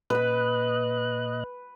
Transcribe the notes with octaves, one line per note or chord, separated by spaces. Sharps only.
A#2 B4 D#5 B5 F#6